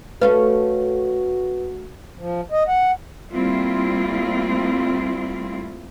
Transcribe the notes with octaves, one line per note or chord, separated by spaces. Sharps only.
A3 C#4 F#4 B4 F5
F3
D#5
F#5
G3 A3 A#3 C4 E4 F4